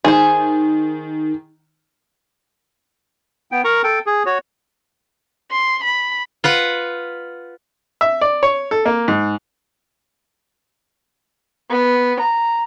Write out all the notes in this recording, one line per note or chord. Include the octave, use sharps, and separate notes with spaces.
D#3 G#4 C5
B3 G5
A#4 A#5 C#6
A4 G5
G#4
F#4 C#5
C6
B5
F4 B4 F#5
E5
D5
C#5
A4
A#3
G#2
B3
A#5